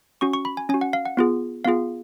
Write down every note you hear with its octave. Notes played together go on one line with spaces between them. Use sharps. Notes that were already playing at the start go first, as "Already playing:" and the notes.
C#4 F#4 C#6
C#6
B5
G#5
C#4 F#4 G#5
F#5
F5
F#5
B3 F4 G#4
B3 F4 G#4 F5